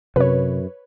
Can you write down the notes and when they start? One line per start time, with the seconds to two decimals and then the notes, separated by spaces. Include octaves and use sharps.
0.16 F#2 C3 B4 C#5